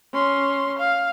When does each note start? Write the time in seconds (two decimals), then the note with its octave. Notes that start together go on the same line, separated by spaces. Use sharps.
0.13 C#4 C6
0.79 F5